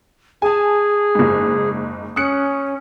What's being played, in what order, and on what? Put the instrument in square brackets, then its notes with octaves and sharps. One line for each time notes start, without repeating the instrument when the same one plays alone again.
[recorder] G#4 [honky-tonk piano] G#5 A5
[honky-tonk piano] F#1 G#2
[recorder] C#4 [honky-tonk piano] D#6 F#6 C#7